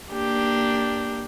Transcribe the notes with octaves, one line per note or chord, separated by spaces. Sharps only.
A#3 D4 G4